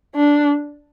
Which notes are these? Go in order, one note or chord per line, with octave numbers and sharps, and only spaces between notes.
D4